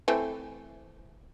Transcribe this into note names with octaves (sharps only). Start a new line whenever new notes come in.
E3 A3 C4